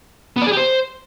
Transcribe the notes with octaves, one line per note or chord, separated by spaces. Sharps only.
B3
D5
G#4
G4
C5